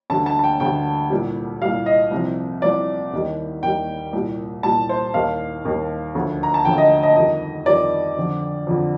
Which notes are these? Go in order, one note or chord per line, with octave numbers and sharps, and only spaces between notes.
D2 D3 G3 A5
A5
A5
G5
D2 D3 G3 G5
C2 A#2 G3
C2 A#2 G3 F5
D#5
C2 C3 F3
C2 C3 F3 D5
D#2 D#3 G3
D#2 D#3 G3 G5
C2 A#2 G3
C2 A#2 G3 A5
C5
D#2 D#3 G3 F5
D#2 D#3 G3
D2 D3 F3
A#5
A5
D2 D3 F3 G5
D#5
D#5
F2 D#3 G3 D#5
F2 D#3 G3 D5
F2 D3 F3
F2 D3 F3